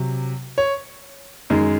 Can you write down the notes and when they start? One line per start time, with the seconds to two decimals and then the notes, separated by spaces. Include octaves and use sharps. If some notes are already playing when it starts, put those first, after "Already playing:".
Already playing: C3 F#3
0.58 C#5
1.50 F#2 D#3 G#3